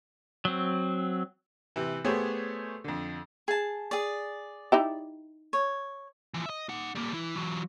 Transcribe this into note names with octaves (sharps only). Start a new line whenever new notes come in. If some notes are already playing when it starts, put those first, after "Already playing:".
F#3 C4
C3 E3
A3 B3 G4 G#4 C5 C#5
F2 D3
G#4 A5
G#4 D5
D#4 E4 G4
C#5
E3 F3
D#5 E5
D#4 F#5
G3 A#3
E3 E4
E3 F#3